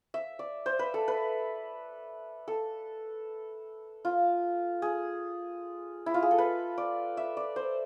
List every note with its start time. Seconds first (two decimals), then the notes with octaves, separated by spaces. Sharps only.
0.14 E5
0.39 D5
0.66 C5
0.79 B4
0.94 A4
1.08 B4
2.48 A4
4.05 F4
4.82 G#4
6.06 E4
6.14 F4
6.22 G#4
6.31 A4
6.38 B4
6.78 D5
7.17 E5
7.37 D5
7.56 C5